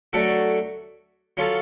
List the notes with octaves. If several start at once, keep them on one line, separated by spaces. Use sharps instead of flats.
F#3 A3 D4 F#4 A4
F#3 C#4 F4 A4